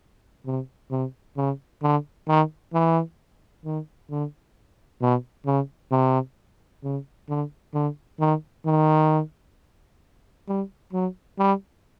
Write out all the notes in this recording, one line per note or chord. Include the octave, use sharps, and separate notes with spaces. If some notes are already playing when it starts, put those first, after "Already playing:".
C3
C3
C#3
D3
D#3
E3
D#3
D3
B2
C#3
C3
C#3
D3
D3
D#3
D#3
G3
F#3
G3